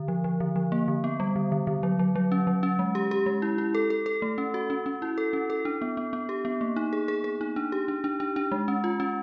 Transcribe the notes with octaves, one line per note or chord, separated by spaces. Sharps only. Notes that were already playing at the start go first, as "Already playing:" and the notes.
Already playing: D3
F3
F3
D3
F3
A#3
D3
B3
G3
D3
D3
D3
F#3
F#3
F#3
C#4
F#3
C#4
G#3
G4
G4
G#3
E4
E4
A4
A4
A4
A3
C#4
F#4
C#4
C#4
E4
A4
C#4
A4
D4
B3
B3
B3
G4
B3
A#3
D#4
G#4
G#4
G#4
D#4
D4
G4
D4
D4
D4
D4
G#3
C#4
F4
C#4